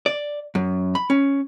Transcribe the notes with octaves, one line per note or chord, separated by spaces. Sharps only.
D5
F#2
B5
C#4